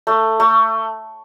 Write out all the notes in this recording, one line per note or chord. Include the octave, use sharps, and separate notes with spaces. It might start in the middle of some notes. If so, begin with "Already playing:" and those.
A3
A3